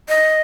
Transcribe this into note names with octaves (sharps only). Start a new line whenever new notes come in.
D#5